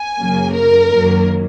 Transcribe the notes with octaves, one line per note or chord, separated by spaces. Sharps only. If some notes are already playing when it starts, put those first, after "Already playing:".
Already playing: G#5
F#2 C#3 F#3 A#3
A#4
F#2 D#3 F#3 A#3